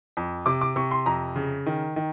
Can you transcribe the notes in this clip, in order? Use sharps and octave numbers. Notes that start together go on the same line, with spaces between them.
F2
C3 D6
D6
C3 C#6
C6
F2 A#5
C#3
D#3
D#3